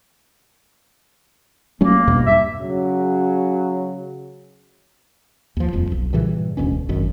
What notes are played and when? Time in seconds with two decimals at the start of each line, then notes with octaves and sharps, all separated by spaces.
1.81 F#3 A3 A#3 C#4
2.08 E2 G2 B2
2.26 G2 E5
2.60 C#3 F#3
5.57 D#2 F3
5.73 D#1 F2
5.92 B1
6.13 G2 A#2 C#3 E3
6.57 E1 D2 B2 C#4
6.89 G#1 F#2 D#3